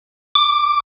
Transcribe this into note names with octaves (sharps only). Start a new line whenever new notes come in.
D6